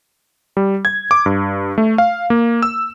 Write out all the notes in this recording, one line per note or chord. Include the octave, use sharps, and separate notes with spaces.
G3
G#6
D6
G2
A3
F5
A#3
E6